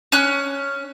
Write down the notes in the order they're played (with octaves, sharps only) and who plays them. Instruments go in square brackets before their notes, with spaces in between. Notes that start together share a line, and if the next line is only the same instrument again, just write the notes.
[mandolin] C#4 F#6